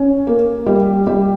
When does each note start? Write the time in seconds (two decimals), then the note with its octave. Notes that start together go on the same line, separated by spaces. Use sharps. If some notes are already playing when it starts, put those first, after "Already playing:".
Already playing: C#4
0.27 A#3
0.67 G3
1.07 G3